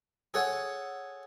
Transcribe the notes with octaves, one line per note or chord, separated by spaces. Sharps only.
G#4 A4 C#5 F#5 G#5